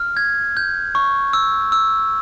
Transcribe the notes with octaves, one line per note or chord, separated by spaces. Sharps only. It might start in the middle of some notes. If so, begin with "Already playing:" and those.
Already playing: F6
G#6
G6
C#6
E6
E6